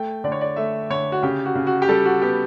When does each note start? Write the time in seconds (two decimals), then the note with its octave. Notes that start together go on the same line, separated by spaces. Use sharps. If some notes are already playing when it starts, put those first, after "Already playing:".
Already playing: A3 G5
0.24 D3 D5
0.32 C#5
0.41 D5
0.56 A3 E5
0.90 D3 C#5
1.12 F#4
1.23 C#3 G4
1.45 F#4
1.55 C#3
1.67 F#4
1.82 G4
1.89 G3 A4
2.06 F#4
2.22 B3 G4